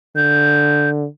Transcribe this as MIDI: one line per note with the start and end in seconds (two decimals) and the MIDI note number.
0.16 1.05 50
0.16 0.90 91